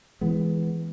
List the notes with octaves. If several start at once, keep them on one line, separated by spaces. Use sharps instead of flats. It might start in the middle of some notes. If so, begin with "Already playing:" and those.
E3 G#3 B3